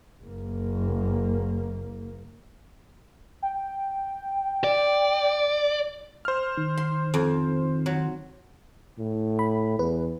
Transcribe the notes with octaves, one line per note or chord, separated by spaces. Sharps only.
F#1 A#3
G5
D5
C5 F6
D#3
C6
F2
F#3
A2
B5
E2 B4